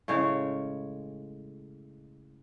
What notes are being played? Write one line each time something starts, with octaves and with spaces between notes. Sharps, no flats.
A2 C#3 G#3 C#5